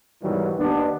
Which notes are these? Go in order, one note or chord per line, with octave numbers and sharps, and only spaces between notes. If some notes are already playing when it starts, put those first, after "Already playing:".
G#2 B2 D#3 E3 F#3 G3
D#2 B3 D4